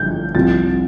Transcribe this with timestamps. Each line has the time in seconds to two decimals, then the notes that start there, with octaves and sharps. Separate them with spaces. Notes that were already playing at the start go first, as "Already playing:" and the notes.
Already playing: G1 G2 F3 G6
0.35 C2 C3 F3 A6